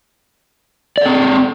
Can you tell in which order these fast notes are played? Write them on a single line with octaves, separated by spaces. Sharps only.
D5 A4 C4